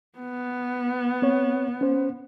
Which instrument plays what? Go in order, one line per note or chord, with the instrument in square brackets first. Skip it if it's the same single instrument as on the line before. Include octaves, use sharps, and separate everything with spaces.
[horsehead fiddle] B3
[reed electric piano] C4 C#5
C#4 C5